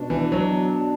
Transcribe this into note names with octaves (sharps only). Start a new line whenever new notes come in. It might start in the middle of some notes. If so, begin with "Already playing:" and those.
Already playing: B2 D4
E3
B2 F#3